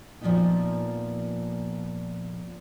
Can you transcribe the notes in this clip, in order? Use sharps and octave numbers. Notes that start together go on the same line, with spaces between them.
A#2 F3 G#3 A#3 B3 D#4